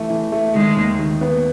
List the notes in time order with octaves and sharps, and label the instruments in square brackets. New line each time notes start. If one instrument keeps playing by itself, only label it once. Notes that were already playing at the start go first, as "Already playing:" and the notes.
Already playing: [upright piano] E3 A3
E3
A3
[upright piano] D#3 [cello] G#3
[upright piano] D#2
D#3
B3